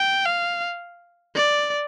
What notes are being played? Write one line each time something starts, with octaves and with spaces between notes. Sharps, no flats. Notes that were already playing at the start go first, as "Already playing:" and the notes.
Already playing: G5
F5
D5